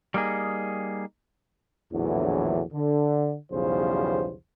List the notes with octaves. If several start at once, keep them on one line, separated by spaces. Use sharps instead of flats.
G3 A#3 D#4 G#4
A#1 E2 A2 D3 E3 F#3
D3
B1 E2 C#3 F3 G3 C5